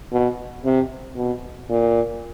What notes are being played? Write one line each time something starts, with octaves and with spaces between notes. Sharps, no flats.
B2
C3
B2
A#2